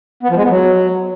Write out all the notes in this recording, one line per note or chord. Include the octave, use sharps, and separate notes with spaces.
B3
F3
G#3
B3
F#3